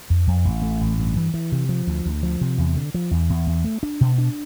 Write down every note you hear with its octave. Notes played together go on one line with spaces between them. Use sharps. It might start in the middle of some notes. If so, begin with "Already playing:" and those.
F2
F2
A1
A3
A1
G2
E3
E3
C3
F3
D2
D2
F3
C3
E2
D3
F3
E2
E2
E2
A3
D4
B2
D4